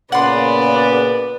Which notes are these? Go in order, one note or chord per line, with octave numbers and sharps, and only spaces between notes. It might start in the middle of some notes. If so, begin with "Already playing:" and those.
A#2 C#3 B3 B4 D5 F#5 C6